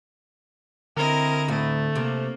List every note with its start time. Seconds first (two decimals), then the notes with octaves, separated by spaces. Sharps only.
0.97 D3 C4 E4 A#4 D#5
1.48 D2 A2 A3
1.96 C3 A#3